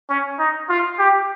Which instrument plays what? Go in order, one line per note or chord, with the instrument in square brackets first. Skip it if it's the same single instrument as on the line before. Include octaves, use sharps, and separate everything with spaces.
[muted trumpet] C#4
D#4
F4
G4